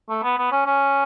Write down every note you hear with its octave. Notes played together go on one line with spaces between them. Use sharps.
A3
B3
B3
C#4
C#4